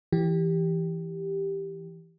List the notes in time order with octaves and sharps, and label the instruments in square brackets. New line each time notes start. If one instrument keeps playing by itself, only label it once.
[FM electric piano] E3 G4